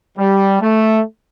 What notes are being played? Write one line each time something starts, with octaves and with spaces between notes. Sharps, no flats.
G3
A3